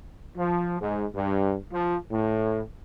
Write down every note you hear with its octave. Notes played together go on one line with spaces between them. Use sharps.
F3
G#2
G2
F3
A2